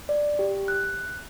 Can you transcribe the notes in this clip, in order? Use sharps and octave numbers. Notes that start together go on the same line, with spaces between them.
D5
G4
F#6